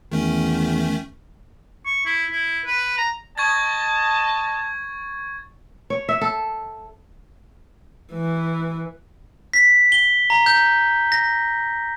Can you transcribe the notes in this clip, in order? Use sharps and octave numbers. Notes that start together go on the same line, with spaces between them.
E2 D#3 A3 C#4
C#6
E4
E4
B4
A#5
D#5 A5 C#6 G#6 A6
C#5
E5
A4
E3
B6
G7
A#5
G6
A#6